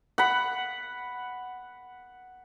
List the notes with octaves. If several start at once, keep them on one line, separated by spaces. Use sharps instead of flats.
F#5 B5